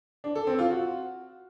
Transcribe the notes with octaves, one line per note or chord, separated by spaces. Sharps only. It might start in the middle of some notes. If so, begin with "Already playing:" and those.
D4
A4
C4
F4
F#4